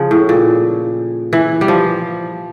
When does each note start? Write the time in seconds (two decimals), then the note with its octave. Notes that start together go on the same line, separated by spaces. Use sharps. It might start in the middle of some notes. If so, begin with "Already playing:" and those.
Already playing: C#3 F3
0.11 A2
0.29 A#2
1.33 E3
1.61 G3
1.68 F3